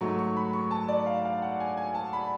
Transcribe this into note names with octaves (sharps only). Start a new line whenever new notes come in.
G#2 F#3 A3 C#6
C#6
B5
C#6
A5
D5
F5
F5
F#5
G#5
G#5
A5
B5